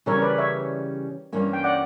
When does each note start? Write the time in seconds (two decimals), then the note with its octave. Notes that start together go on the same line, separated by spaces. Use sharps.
0.06 C#3 E3 G3 C#4 A#4 C#5
0.22 B4 D5
0.38 C#5 E5
1.32 G2 E3 A#3 C#4
1.53 G5
1.64 D5 F#5